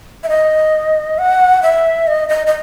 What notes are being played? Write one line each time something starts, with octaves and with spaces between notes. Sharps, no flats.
E5
D#5
F#5
E5
D#5
D#5
D#5